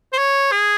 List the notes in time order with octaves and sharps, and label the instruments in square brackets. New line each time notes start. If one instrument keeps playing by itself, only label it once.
[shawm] C5
C#5
G#4